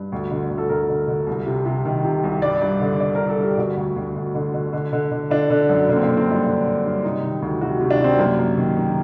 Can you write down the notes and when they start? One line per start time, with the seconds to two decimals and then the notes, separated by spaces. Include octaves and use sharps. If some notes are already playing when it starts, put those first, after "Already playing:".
Already playing: G2
0.12 D2
0.31 D3
0.50 D2
0.58 A4
0.69 D2 A#4
0.89 D3
1.08 D3
1.27 C2
1.46 C3
1.66 C3
1.85 D#3
2.04 C3
2.24 C2
2.42 G2 D5
2.62 G2
2.81 D3
3.00 D3 D5
3.15 G2 A#4
3.29 A4
3.38 G2
3.44 G4
3.58 D3 F#4
3.77 D2
3.96 D2
4.16 D2
4.35 D3
4.54 D3
4.73 D3
4.93 D3
5.11 D3
5.30 D3 D4
5.50 D3
5.69 F#2
5.89 D3 A#3
5.96 C4
6.03 A#3
6.08 D3
6.17 C4
6.27 G2 D4
6.46 D3 D4
6.65 D3
6.85 G2
7.04 C3 D#4
7.23 D#3
7.42 D2
7.61 C3 F#4
7.80 C3
7.91 D4
8.00 C3 C4
8.19 F#2 A#3
8.39 F#2
8.57 D#3
8.77 D#3